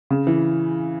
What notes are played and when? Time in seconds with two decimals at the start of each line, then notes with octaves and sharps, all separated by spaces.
0.11 C#3
0.27 E3